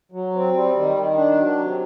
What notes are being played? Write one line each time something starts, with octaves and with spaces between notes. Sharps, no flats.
F#3
C4
G3
D#3
D#3
D4
F#3
C3